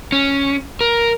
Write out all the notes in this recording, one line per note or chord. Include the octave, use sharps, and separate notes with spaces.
C#4
A#4